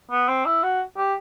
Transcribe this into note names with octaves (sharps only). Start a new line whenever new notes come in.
B3
C4
E4
F#4
G4